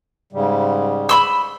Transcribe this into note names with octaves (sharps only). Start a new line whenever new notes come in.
G#2 C#3 G3
B5 C6 E6